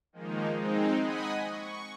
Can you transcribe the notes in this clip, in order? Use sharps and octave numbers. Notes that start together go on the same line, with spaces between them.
D#3 F3 G#3 A#3 D#4
G#3 C4 D#4
D#5 F#5 G#5 B5 D#6
C#6